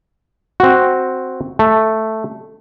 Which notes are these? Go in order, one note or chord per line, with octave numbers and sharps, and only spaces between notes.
C4 F#4
A3